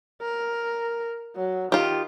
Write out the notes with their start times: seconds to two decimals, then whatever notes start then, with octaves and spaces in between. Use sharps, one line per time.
0.21 A#4
1.36 F#3
1.72 D#3 F4 G4